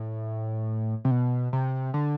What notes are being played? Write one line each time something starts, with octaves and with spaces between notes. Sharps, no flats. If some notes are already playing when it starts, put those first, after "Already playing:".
Already playing: A2
C3
B2
C3
D3